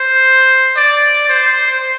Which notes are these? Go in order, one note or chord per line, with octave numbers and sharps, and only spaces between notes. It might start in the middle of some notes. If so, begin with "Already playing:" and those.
Already playing: C5
D5
C5